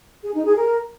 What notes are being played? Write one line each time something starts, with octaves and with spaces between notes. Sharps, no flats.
G#4
D#4
G#4
A#4